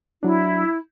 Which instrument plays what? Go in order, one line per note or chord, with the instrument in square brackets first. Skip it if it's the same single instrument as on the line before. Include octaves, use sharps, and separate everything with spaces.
[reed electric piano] F#3 D4 [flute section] E4